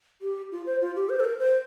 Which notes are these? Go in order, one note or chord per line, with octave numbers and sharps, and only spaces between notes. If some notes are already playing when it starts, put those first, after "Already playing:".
G4
F4
C5
F4
G4
C5
A4
A#4
C5